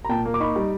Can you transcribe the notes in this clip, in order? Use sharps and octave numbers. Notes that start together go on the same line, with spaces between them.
A#5
A#2 G5 A5
A#3
D6
D#4 B5 C#6
G3